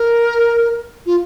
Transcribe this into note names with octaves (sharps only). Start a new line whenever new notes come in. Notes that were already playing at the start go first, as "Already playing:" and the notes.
Already playing: A#4
F4